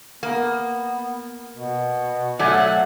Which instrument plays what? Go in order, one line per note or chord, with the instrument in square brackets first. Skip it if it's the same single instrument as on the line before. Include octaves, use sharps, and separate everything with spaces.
[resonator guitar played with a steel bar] A#3 [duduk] B3
[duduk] B2
[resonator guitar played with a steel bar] F#3 A3 [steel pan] D5 G#5 [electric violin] F#5